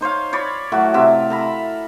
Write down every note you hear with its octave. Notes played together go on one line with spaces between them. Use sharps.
D#4 C5 C#5 F5
C#5 D5 B5
A2 F#3 F#4
C3 E5 F5 D6
A4 A#5 B5